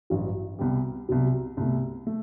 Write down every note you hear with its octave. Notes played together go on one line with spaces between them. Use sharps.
A1 G2 F#3
C2 B2 G3
C2 B2 F#3
C2 B2 A3
A3